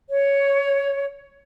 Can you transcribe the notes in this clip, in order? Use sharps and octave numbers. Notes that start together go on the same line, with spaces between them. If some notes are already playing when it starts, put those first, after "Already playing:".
C#5